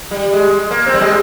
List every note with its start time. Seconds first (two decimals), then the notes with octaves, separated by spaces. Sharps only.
0.11 G3
0.33 G#3
0.71 A#3
0.86 C4
0.94 G3
1.01 G#3